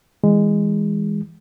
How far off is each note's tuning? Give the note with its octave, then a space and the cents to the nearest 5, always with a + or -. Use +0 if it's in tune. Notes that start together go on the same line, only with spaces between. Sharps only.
E3 -20 G#3 -15